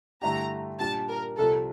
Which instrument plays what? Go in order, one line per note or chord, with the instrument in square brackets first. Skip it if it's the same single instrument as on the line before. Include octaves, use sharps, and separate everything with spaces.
[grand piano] G2 D3 A3 E4 G4 [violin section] A#5
[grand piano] A#2 G3 D4 [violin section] A5
[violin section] A#4
[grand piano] C2 C3 F3 [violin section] A4